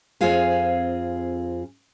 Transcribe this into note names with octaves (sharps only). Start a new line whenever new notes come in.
F2 C4 F4 G#4 F5 G#5